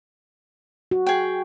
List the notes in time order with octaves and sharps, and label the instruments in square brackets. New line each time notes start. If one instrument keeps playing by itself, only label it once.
[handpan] F#4
[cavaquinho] G#4 G5